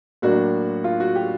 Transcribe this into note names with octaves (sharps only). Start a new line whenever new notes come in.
A2 F#3 A#3 D4 F#4
F4
F#4
G4